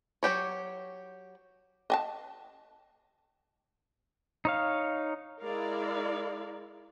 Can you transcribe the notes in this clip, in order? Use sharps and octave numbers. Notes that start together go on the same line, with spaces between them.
F#3 C4 G4 C#5
D#5 G#5 A5
D#4 C#5 F5
G#3 E4 A#4 D5 F5